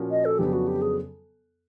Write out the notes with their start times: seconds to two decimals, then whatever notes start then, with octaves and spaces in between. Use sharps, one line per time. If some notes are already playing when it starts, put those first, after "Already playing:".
Already playing: A#2 F3 A#3 C#4 F#4
0.11 D#5
0.25 A4
0.39 F2 C#3 F#3 B3 D4 G4
0.53 F#4
0.68 G4
0.82 G#4